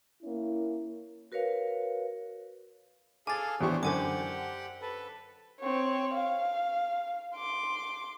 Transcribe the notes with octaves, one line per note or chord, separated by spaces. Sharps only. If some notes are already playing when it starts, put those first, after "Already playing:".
A#3 C#4 E4
F#4 A#4 B4 C#5 F5
G#4 A4 F5 G#5 D6 A6
E2 D4 G4 C5 C#5 C#6
F#2 D3 G4 C5 F#5 G#5 D6
A4 B4
C4 C#5
F5
C6 D6